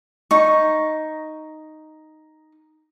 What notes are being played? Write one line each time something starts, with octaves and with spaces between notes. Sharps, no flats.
D#4 C#6